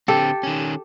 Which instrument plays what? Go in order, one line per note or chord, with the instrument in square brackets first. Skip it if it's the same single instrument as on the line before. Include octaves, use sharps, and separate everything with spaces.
[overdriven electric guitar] D3 C4 [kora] G4 A4
[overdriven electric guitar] D#3 C#4